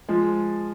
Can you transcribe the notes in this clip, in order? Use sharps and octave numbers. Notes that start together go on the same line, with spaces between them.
F3 G#3